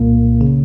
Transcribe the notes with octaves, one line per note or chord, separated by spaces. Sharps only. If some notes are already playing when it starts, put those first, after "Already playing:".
Already playing: C2 A#2 A#3
C#3